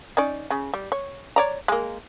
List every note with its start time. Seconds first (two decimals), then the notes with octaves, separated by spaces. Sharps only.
0.17 C#4 D#4 D5
0.50 C#3
0.74 G3
0.92 C#5
1.36 C#5 D5 A#5
1.68 G#3 A#3